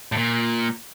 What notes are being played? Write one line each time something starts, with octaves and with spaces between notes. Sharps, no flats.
A2
A#2